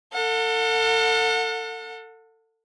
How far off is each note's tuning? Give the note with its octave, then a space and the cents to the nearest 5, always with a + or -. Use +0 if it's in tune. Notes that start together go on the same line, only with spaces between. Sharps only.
A4 +35 F#5 -30